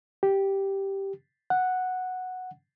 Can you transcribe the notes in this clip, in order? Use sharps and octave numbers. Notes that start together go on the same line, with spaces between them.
G4
F#5